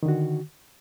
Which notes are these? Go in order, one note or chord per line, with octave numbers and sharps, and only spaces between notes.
D3 D#3 F#4